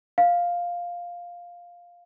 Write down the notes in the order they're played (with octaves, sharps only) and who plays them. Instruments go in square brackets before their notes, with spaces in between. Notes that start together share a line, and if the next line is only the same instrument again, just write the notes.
[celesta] F5